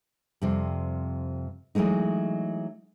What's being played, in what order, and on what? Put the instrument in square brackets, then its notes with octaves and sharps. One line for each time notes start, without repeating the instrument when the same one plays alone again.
[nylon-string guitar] F2 C3 G3
E3 F#3 G#3 A3 D#4